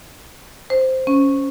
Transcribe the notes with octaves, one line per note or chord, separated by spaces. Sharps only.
C5
C#4